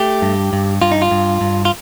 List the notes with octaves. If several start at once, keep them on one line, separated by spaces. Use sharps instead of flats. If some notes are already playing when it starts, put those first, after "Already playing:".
Already playing: A3 G4
G2
G2
G2 F4
D#4
F4
G2
G2
F4